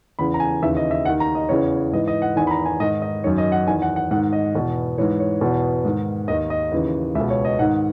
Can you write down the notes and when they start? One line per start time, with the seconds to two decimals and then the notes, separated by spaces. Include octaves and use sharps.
0.19 E2 C#3 E3 B5
0.34 A#5
0.40 G#5
0.62 D#2 C#3 E3 E5
0.77 D#5
0.91 E5
1.05 D#2 D#3 F#5
1.20 A#5
1.35 D#5
1.49 E2 C#3 E3 C#5
1.92 G#2 E3 D#5
2.08 D#5
2.22 F#5
2.36 E2 D#3 G#5
2.47 B5
2.51 A#5
2.65 G#5
2.80 G#2 D#3 D#5
3.02 D#5
3.24 F#2 D#3 C#5
3.38 D#5
3.52 F#5
3.67 E2 D#3 G#5
3.82 F#5
3.96 F#5
4.11 G#2 F#5
4.15 D#3
4.33 D#5
4.55 E2 B2
4.98 G#2 E3 C#5
5.20 C#5
5.41 E2 B2
5.85 G#2 D#3
6.28 D#2 D#3 D#5
6.50 D#5
6.72 D#2 C#3 E3
7.15 C#2 E5
7.20 B2
7.30 C#5
7.45 D#5
7.59 G#2 D#3 F#5